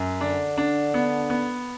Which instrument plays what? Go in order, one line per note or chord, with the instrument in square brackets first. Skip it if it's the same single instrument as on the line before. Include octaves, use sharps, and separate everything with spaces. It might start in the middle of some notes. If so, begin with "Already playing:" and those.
Already playing: [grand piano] F#2
[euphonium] D3 [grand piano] D4
[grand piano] D4
B3
B3